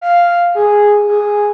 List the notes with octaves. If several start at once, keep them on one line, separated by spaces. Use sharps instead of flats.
F5
G#4
G#4